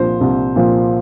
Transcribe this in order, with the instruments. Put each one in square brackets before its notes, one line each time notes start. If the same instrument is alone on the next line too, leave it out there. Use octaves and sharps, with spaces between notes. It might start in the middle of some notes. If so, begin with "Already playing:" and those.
Already playing: [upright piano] C2 A#2 F3 C5
C2
A#2 F3